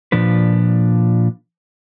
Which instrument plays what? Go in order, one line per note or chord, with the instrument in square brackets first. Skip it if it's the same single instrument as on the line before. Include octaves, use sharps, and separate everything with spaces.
[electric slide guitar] A#2 F3 D4 B4